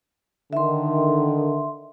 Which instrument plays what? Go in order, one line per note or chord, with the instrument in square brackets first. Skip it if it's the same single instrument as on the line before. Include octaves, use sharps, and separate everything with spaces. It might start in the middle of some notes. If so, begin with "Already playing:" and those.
[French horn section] D3 D#3 [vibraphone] E5 C6